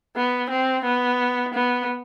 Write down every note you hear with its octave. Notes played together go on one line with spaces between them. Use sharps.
B3
C4
B3
B3